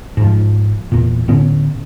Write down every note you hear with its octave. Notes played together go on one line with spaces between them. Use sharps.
G#2 F3
E2 A#2
A2 D3 B3 C#4